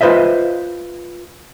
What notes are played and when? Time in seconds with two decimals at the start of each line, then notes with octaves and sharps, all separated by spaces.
0.01 F4 B4 C5 D#5 E5